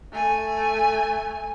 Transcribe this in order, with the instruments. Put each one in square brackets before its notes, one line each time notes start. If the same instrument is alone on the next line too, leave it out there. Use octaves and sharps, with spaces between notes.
[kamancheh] A3 G#5